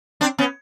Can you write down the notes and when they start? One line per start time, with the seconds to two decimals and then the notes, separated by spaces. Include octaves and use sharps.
0.21 C4 D4
0.38 B3 C#4